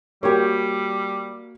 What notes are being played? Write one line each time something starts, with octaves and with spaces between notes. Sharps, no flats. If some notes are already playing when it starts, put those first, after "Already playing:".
G3 A#3 F#4 G4 C#5